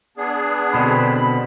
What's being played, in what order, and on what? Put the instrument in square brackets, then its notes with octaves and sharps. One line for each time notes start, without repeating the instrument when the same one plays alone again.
[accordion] B3 D4 G#4
[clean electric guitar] B2 D3 C4 [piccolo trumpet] B5